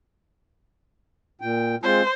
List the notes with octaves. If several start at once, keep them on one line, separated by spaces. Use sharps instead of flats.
A#2 G5
G#3 C4 F4 C5